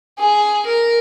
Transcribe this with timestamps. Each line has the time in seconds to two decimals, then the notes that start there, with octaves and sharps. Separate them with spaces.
0.18 G#4
0.66 A#4